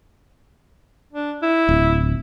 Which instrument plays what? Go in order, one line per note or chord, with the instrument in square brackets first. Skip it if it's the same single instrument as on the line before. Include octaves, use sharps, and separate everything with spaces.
[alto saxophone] D4
E4
[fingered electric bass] D1